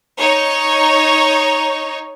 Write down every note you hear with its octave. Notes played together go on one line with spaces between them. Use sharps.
D#4 C#5